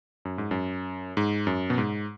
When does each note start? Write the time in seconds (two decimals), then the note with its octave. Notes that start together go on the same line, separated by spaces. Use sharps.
0.25 F#2
0.38 G#2
0.51 F#2
1.17 G#2
1.47 F#2
1.70 B2
1.78 G#2